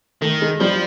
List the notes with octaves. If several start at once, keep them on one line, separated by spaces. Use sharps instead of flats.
D#3 A3
G#3
F3 G3